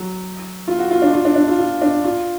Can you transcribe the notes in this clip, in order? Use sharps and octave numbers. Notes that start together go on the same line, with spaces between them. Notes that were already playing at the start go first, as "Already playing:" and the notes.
Already playing: F#3
F4
F#4
F4
D4
F4
D4
D4
F4
F4
D4
F4